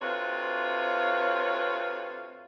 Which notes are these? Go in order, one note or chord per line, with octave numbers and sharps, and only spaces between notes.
D2 C3 F4 B4 C#5